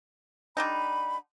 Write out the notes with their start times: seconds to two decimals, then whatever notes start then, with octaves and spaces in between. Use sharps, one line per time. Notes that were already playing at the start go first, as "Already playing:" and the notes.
0.57 D3 G3 D#4 B5